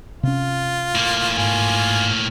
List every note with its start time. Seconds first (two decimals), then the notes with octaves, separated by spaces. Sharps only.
0.23 C3 C#4 F4
0.95 A2 A#3
1.38 G#2 F4 G#5